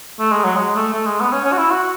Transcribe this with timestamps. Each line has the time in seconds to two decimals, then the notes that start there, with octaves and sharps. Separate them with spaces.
0.19 A3
0.32 G#3
0.44 F#3
0.56 G#3
0.76 A3
0.94 A3
1.07 G#3
1.20 B3
1.32 C#4
1.45 C#4
1.53 F#4
1.58 E4
1.71 F#4